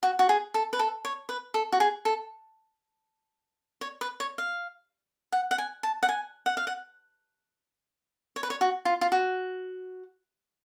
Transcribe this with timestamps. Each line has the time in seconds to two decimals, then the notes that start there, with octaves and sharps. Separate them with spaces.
0.03 F#4
0.19 F#4
0.29 G#4
0.54 A4
0.73 B4
0.79 A4
1.05 C#5
1.29 B4
1.54 A4
1.72 F#4
1.80 G#4
2.05 A4
3.81 C#5
4.01 B4
4.20 C#5
4.38 F5
5.32 F#5
5.51 F#5
5.58 G#5
5.83 A5
6.03 F#5
6.09 G#5
6.46 F#5
6.57 F5
6.67 F#5
8.36 C#5
8.43 B4
8.50 C#5
8.61 F#4
8.85 F4
9.01 F4
9.12 F#4